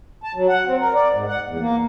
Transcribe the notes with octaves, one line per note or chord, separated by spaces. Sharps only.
A5
F#3
F#5
C4
A#4
D5
G#2
F#5
E2
A#3